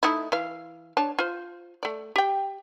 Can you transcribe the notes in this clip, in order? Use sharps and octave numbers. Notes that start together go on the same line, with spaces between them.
A3 D#4 E4
E3 F5
D4 C#5 A5
F4 C5
A3 D5
G4 G5